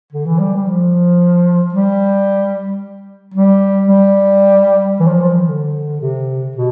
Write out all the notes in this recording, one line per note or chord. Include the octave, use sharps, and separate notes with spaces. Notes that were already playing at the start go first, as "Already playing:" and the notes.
D3
E3
G3
G3
F3
G3
G3
G3
E3
F3
F3
E3
D3
C3
B2